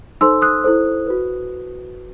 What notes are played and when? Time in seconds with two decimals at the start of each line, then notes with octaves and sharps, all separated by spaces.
0.21 D#4 A4 C5 C6 E6
0.42 D#6 F#6
0.64 E4 A4 C5
1.07 F#4 B4